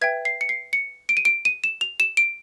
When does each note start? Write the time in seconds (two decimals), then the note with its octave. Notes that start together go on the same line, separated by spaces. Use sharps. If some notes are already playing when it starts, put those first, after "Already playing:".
0.01 B4 E5 G5 G#6
0.25 C7
0.41 C#7
0.49 C7
0.73 C#7
1.09 D7
1.17 D#7
1.25 D7
1.45 D#7
1.64 E7
1.81 F7
2.00 E7
2.17 D7